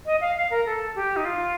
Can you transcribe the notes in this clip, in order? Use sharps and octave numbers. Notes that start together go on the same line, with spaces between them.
D#5
F5
F5
A#4
A4
G4
D#4
F4